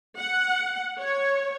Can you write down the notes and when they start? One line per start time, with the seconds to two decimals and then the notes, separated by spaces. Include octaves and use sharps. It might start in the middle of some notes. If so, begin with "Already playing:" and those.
0.19 F#5
1.01 C#5